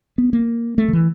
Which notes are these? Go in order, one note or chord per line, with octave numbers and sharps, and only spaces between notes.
B3
A#3
A3
D#3
E3